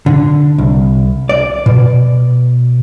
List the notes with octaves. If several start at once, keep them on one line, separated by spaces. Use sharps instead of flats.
D3
C2
D5
B2